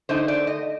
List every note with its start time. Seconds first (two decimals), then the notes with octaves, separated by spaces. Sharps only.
0.09 D3 A3 D#4 C5
0.28 D5
0.47 D#5